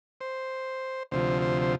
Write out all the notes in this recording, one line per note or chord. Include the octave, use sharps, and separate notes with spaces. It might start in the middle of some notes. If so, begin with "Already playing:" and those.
C5
D2 C3 F3 C5
C5
C5